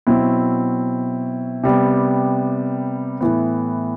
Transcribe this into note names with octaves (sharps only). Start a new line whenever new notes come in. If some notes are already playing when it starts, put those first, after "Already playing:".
B2 F#3 C4 E4
C3 G3 B3
A2 E3 B3